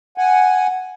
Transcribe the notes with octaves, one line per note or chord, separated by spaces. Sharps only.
F#5 G#5